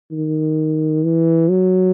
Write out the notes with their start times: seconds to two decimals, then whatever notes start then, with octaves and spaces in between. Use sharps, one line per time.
0.11 D#3
1.04 E3
1.50 F#3